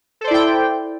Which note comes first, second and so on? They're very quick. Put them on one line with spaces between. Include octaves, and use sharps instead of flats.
A4 C5 D5 E4 G5